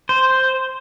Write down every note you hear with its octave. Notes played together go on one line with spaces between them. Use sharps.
C5